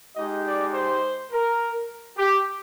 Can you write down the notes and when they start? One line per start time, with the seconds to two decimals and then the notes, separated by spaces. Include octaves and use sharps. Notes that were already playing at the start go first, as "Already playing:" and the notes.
0.16 G#3 D#4 G4 D#5
0.46 D5
0.74 C5
1.31 A#4
2.18 G4